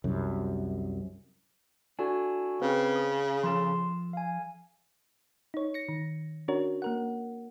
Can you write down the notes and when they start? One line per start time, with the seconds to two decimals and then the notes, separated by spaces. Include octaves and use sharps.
0.04 C2 F#2
1.99 D4 E4 F#4 A4 G#5
2.62 C#3 C4 B4 G5
2.96 D#6
3.44 F3 A4 C6
4.13 F5 G#5
5.54 D#4 C#5
5.74 A#6 C#7
5.89 D#3
6.48 C#4 D4 F#4 A#4 C#5
6.82 A#3 A#4 F#5